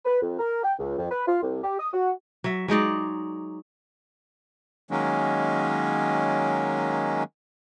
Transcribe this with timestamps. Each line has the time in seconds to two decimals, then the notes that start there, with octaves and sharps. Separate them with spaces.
0.06 B4
0.22 F2
0.39 A#4
0.63 G5
0.79 C#2
0.98 F2
1.11 B4
1.28 F4
1.43 C2
1.64 G4
1.80 D#6
1.94 F#4
2.44 F#3 E5
2.68 F#3 G#3 D#4 D5
4.91 D#3 F#3 G#3 A#3 C#4